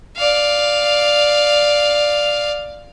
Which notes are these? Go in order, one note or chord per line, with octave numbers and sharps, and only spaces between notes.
D5 F5